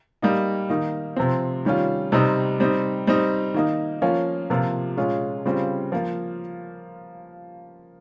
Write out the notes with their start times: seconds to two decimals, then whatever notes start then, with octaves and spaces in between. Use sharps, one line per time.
0.22 G3 A#3 D#4
0.70 D#3 A#3 D#4
1.16 C3 F3 C4
1.65 D#3 G3 C#4 F4
2.12 C3 G3 C4 D#4
2.60 G3 C4 D#4
3.07 G3 C4 D#4
3.54 D#3 A#3 D#4
4.02 F3 A#3 C#4 F4
4.50 C3 F3 A#3 F4
4.97 A#2 G#3 C#4 F4
5.46 C#3 G3 C4 F4
5.92 F3 A#3 F4